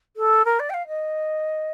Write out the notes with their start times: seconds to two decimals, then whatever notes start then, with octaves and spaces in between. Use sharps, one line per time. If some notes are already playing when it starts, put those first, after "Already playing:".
0.17 A4
0.45 A#4
0.60 D5
0.70 G5
0.74 F5
0.88 D#5